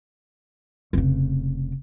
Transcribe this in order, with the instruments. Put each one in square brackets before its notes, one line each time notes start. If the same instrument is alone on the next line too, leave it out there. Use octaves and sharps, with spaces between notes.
[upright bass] F1 C#3